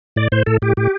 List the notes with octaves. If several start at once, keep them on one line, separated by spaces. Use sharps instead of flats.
A2 D5
A2 C5
A2 A4
A2 G4
A2 G4